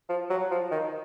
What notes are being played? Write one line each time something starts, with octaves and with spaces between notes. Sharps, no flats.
F3
F#3
F3
D#3